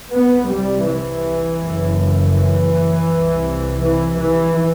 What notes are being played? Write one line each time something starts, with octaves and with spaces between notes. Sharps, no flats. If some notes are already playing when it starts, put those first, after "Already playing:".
C2 C3 B3
G3
E3
F#1 F#2
E3
C2 C3
E3
E3